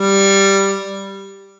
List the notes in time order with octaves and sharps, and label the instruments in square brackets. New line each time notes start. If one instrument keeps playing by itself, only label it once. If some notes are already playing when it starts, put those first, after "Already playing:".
Already playing: [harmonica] G3